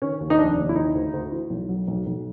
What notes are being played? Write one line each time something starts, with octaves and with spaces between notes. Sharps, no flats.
D#3 C#4
D#2
D#4
F1 D4
D#2
E4
E3 D#4
D2
D2
E3
B1
F#3
B1
B1